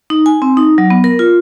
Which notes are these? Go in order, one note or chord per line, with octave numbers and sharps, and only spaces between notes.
D#4
G#5
C4
D#4
F#3
B3
A#4
F4